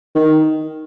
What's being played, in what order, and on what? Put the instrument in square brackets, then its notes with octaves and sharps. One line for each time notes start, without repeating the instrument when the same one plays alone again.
[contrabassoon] D#3